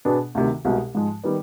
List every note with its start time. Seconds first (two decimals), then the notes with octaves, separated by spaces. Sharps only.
0.05 B2 B3 D4 G#4
0.35 D2 C3 D#3
0.65 C2 B2 G#3
0.95 G#2 F3 G#3
1.24 D#3 G3 B3